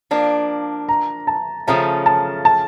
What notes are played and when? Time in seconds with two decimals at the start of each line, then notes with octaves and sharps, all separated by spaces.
0.11 F3 A#3 D4
0.89 A#5
1.27 A5
1.67 C#3 F3 A3 C#4 A#5
2.06 A5
2.45 A5